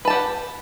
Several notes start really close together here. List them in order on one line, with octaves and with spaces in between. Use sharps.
B4 A5 G4 F#5